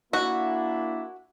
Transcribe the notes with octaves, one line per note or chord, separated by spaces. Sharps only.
A#3 D4 E4 F#4